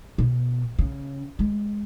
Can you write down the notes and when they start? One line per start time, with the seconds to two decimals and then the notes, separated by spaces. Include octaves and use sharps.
0.18 B2
0.79 C#3
1.39 G#3